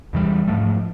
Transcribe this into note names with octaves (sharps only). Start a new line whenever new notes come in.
E2 C#3 E3 G3
G#2 F3 A3